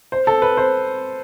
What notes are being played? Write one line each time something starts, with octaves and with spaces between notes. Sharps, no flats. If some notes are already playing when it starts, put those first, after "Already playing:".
C5
A4
B4
C5